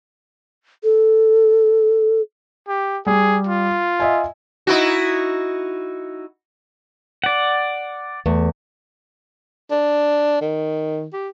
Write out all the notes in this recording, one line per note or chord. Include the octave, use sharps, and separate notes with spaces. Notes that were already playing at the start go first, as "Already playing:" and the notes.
A4
G4
G3 G#4
F4
D#5 E5 G#5
D#4 E4 F#4
D5 F#5
E2 A3
D4
D#3
G4